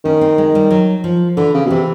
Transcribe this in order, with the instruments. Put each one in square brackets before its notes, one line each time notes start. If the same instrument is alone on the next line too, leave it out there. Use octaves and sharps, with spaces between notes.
[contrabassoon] D#3 [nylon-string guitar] C#4
[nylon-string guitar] C4
G#3
G3
F#3
F3
[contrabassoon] D3 [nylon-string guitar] E3
[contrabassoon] C#3
B2
[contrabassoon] C3 [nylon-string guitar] E3